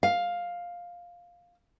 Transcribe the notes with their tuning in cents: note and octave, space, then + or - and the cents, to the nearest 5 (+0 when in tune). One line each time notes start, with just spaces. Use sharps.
F5 +5